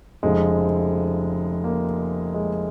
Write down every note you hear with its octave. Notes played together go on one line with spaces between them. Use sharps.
F1 F2 C#3 F3 G#3
A#3
G#3